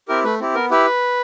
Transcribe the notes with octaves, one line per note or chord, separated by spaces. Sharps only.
C4 E4 G4 A#4
A3 B4
C4 E4 G4
B3 A#4
E4 G4 B4